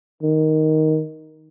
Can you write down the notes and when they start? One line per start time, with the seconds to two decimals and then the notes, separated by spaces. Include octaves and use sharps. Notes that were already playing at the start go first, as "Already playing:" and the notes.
0.23 D#3